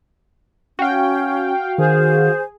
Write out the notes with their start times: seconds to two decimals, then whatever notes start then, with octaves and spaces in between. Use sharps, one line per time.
0.79 C#4 F#4 F5 G5
1.78 D#3 G#4 C5